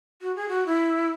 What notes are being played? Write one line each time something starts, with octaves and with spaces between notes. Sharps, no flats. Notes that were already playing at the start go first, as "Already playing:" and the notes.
F#4
G#4
F#4
E4